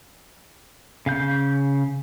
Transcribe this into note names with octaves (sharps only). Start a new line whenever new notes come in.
C#3 F5 G6